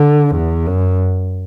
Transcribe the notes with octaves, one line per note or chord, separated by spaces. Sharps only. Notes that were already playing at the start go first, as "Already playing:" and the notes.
Already playing: D3
E2
F#2